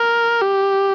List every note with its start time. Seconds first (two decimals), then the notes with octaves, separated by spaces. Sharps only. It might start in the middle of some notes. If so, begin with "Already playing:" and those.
Already playing: A#4
0.41 G4